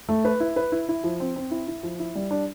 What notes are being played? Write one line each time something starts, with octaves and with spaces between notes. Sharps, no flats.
A3
B4
E4
B4
E4
E4
F3
C4
C4
E4
E4
F3
E4
G3
D4